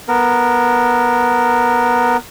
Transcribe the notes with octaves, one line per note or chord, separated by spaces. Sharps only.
B3 A#4